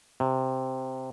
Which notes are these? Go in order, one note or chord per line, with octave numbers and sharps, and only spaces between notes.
C3